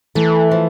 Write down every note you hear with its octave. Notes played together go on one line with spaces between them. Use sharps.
E3 A3
F3